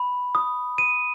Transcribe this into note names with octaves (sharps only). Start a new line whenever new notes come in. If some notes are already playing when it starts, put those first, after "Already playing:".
Already playing: B5
D#6
D#7